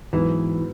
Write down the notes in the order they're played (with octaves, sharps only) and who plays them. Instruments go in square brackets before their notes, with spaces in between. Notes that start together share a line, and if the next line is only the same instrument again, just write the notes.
[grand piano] G#2 F#3 B3 [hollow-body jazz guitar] E3